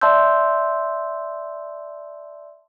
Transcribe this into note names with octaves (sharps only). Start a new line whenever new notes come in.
D5 E5 A5 C6 E6 G6